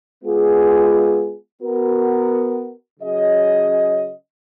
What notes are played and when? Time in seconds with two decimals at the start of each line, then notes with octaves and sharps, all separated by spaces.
0.24 G#3 B3 F4 G#4
1.62 B3 F#4 A#4
3.00 C#3 F#3 C#4 G#4 D#5